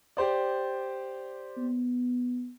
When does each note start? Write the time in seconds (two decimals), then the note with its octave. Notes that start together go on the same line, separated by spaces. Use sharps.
0.17 G4 C5 D5
1.57 B3